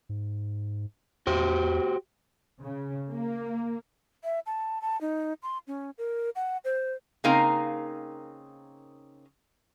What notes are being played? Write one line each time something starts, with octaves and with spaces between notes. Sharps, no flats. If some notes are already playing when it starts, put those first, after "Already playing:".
G#2
E2 F#4 G4 C5
C#3
A#3
E5
A5
A5
D#4
C6
C#4
A#4
F#5
C5
C#3 A#3 C4 D#4 A#4 F5